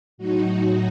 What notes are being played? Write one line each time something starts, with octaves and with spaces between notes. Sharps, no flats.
A2 F#3 D#4 F#4